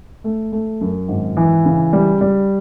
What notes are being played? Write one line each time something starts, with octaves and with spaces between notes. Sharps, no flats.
A3
A3
F#2
G#1
E3
C#3
G3
G3